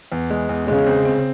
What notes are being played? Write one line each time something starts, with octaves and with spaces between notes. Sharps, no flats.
E2
G#3
E2
C#3 G#3
C4
C4